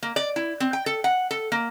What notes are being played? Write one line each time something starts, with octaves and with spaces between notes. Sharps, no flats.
A#3
D5
E4
C4
G5
A4
F#5
A4
A#3